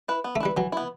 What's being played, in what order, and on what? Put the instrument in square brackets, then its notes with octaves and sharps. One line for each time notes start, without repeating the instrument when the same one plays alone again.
[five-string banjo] E4 B4
B3
[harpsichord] A3
[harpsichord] G3 [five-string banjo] E4 B4
[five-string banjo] E3 [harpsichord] F#3
[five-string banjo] B3 E4